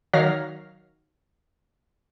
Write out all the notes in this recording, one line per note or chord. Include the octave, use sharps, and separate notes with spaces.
D#3 F#3 C#5 F5 F6 A#6